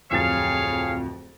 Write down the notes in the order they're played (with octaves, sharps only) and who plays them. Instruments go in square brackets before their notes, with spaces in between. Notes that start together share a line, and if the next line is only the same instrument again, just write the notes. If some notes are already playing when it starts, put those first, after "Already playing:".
[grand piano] D1 F2 A6 [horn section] G#4 C#5 F5